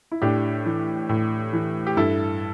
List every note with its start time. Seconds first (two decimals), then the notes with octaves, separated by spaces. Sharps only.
0.11 E4
0.22 A2 D4 G4
0.66 E3
1.09 A2
1.53 E3
1.87 G4
1.97 G2 E4 A4